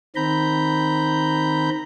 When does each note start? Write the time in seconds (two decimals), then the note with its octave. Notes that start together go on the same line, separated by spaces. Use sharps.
0.16 D#3 C4 A#5 B5 G6